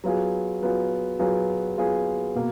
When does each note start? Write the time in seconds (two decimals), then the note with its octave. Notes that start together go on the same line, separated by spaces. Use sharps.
0.04 F#3 B3 F4 G#4
0.62 F#3 B3 F4 G#4
1.19 F#3 B3 F4 G#4
1.78 F#3 B3 F4 G#4
2.35 B2 A#3